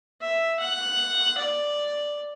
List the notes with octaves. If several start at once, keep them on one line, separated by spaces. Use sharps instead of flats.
E5
F#5
D5